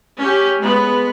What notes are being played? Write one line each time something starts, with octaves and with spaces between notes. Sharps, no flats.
C#4 G4
G#3 B3